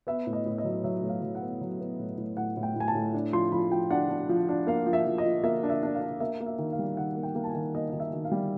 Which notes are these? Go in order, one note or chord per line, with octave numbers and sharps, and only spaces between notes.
B3 E5
A2
D#5
A2
D#5
F#3
F#3 E5
A2
F5
F#3
F#5
B3
F#3
B3
A2
A2
A2 F#5
A2
G5
A2 G#5
A5
A2
D4
F3 C6
F3 B5
F3 G5
D4 F#5
D4
F3
D4
A#3 F5
F3
E5
F3
D#5
F3
A#3 E5
D4
E5
D4
F5
D4
A#3 E5
A#3
E5
D#3
F5
G3
D#3 F#5
A#3
G5
A#3
A5
G#5
D#3
A#3 D#5
D#3 D#5
E5
D#3
F5
G3